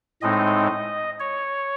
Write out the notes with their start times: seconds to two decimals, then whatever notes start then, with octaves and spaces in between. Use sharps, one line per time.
0.22 A2 G#3 C4 D#4 D#5
1.20 C#5